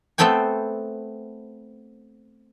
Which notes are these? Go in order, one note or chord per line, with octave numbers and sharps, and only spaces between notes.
A3 B3 C4 A4 G5 G#5